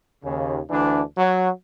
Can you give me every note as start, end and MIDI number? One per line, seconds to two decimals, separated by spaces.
0.24 0.60 39
0.24 0.60 49
0.70 1.01 38
0.70 1.01 52
0.70 1.01 62
1.17 1.49 54